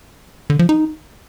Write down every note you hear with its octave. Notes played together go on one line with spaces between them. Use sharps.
D3
F3
D#4